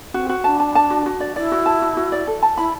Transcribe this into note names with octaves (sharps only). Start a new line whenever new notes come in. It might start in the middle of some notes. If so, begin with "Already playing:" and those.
C4 D4 F#4
F#4
D4 A5
A5
A5
F#4
F#4
D5
E4 D5
F#4
A5
F#4
F#4
D5
A4
A5
E4 B5